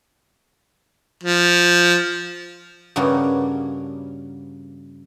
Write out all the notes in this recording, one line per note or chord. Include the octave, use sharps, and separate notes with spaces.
F3
G2 C#3 G3 A#3 F#4